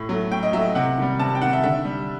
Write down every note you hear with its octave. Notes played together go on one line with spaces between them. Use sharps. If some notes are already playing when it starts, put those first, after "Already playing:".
Already playing: A2
F#3 A3
A2 G5
D#5
F#3 A3 E5
C3 F#5
D#3 G3
C3 A5
G5
D#3 G3 F#5
E5
D3 E5
G3